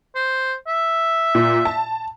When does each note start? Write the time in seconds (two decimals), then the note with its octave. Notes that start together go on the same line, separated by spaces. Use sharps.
0.15 C5
0.68 E5
1.35 A#2
1.65 A5